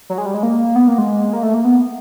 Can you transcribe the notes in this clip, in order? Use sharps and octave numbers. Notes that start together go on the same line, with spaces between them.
F#3
G#3
G3
G#3
A#3
B3
A#3
G#3
A#3
A3
A#3
B3